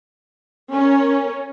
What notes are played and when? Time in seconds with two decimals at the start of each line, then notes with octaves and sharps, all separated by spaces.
0.72 C#4 A#4